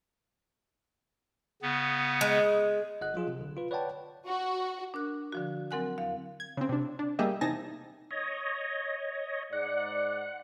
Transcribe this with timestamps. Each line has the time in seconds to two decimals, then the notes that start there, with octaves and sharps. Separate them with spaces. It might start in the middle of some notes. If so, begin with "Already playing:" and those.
1.62 C#3 B3
2.21 G#3
3.01 G1 D#5 F#5 F#6
3.14 F3 F#3 F4 G#4
3.27 C3
3.39 B1 D3
3.57 F4 B4
3.71 B4 C#5 D5 F#5 G5 A5
4.27 F#4
4.94 D4 A#4 F#6
5.32 D3 F3 F#4
5.71 F#3 C4 A#4 F#5 G#5 F#6
5.98 E2 F5
6.40 G#6
6.57 C#3 C4
6.69 C3 D4
6.99 D4
7.19 G3 A#3 G4 G#4 D#5 E5
7.41 E2 C3 D#4 G#5 A5 A#6
8.11 C#5 D#5
9.53 G#2 D5 F#5